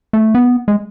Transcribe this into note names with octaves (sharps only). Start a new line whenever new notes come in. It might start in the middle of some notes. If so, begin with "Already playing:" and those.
A3
B3
G#3